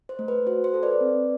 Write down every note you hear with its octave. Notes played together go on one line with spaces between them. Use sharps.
C5
A3
B4
F#4 C5
C5
A4
B4 D5
C4